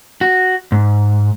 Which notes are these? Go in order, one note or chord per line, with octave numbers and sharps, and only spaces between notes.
F#4
G#2